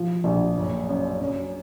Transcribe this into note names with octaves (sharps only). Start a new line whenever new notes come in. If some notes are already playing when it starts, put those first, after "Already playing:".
Already playing: F3
A#1
F#1
F#2
F#2